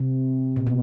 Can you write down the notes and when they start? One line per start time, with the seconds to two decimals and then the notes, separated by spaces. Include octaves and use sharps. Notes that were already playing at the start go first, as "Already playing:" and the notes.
Already playing: C3
0.56 A#2
0.67 B2